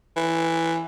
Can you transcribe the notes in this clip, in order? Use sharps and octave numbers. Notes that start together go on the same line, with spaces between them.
E3